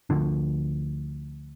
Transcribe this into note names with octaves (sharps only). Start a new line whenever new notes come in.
D2 D3 F3 D4